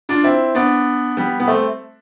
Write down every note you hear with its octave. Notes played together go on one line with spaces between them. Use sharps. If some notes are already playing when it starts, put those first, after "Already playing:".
D4 F4
C4 E4
B3 D4
G3 B3
B3
A3 C4